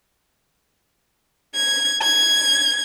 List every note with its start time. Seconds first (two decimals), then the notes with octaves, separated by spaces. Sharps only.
1.55 G#6
2.02 G#6